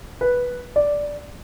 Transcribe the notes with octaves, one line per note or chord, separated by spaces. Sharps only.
B4
D5